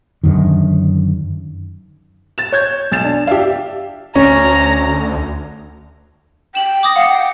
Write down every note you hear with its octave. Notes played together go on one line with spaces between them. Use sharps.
F#2 D3 D#3
A6 E7
C#5 G6 G#6
B1 A6 E7
D4
D4 G4 E5 F5
D2 C#4 A#5
G5 E7 F#7
D6 D#6 A#6
F5 F#5 C#7
G5